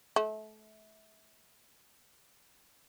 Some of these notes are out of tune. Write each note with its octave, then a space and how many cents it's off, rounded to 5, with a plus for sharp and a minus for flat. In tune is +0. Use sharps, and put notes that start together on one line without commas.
A3 -30